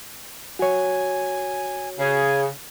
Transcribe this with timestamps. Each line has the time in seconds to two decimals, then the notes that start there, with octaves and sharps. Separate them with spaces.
0.59 F#4 C#5 G#5
1.99 C#3 G#4